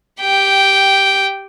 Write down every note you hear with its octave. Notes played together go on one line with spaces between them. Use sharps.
G4 G5